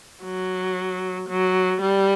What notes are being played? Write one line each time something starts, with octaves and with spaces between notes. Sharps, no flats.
F#3
F#3
G3